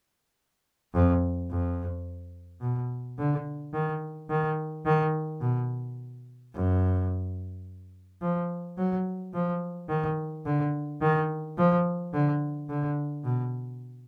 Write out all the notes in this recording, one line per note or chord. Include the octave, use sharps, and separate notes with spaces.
F2
F2
B2
D3
D#3
D#3
D#3
B2
F#2
F3
F#3
F3
D#3
D3
D#3
F3
D3
D3
B2